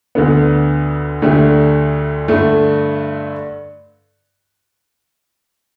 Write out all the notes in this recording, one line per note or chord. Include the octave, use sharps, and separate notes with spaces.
D2 D3 B3
D2 D3 A3 D4 G4
G2 D3 A3